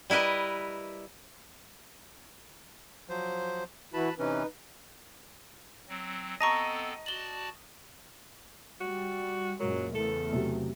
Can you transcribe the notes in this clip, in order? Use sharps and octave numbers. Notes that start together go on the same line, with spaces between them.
G3 E4 A#4 B4 D#5
F3 F#3 C5
E3 E4 F#4 B4 A5 B5
C3 E3 C#4 D#4 B4
F#3 C4
B3 C4 A4 D#5 A5 A#5 C#6
F#4 D5 A5 F#7 G7
G3 F#4
F#2 A#2 F#3 G#3 A#4
E2 C#3 A3 A4
C3 F#3